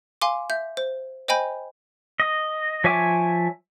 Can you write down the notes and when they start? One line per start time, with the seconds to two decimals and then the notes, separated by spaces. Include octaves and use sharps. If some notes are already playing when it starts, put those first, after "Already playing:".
0.22 F5 G#5 C6 D6
0.50 E5 G6
0.77 C5
1.28 C5 D#5 G5 G#5 B5 G6
2.20 D#5
2.84 F3 C#5 E5 G#5 D6